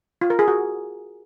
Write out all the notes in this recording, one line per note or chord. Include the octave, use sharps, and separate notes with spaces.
F4
A#4
G#4
F#4